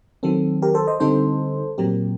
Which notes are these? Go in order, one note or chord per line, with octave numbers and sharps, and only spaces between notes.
D#3 F#3 C4 A4
G4 A#4
A4 C5
C5 D#5
D3 G3 C4 D#4 A4 C5
A#2 F#3 C4 G4 A#4